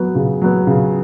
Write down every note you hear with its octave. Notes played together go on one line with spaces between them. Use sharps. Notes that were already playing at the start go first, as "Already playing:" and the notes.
Already playing: F#3 B3
C#3
F#3 B3
C#3